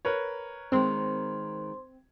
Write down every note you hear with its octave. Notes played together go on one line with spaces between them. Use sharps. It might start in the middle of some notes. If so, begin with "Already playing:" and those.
A#4 B4 C#5
D#3 G#3 C4 C5 C6